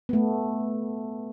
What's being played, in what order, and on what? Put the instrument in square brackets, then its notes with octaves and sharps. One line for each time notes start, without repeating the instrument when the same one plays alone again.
[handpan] A3 B3